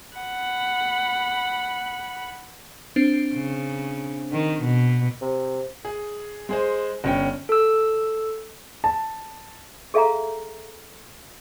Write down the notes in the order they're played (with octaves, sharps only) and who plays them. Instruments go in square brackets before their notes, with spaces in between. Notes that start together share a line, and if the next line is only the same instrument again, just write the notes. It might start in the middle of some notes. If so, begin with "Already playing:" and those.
[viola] F#5 B5
[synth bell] C4 D4 C5
[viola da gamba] C#3
D#3
B2
[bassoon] C3
[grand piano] G#4
G#3 G#4 C5
G1 C#4 G5
[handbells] A4 E6
[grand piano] A5
[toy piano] G#4 A4 E5 F5 A5 A#5